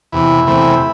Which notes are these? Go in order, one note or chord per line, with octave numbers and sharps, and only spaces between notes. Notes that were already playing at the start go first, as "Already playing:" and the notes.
E2 C3 E3 E4
E2 C3 E3 A3 C4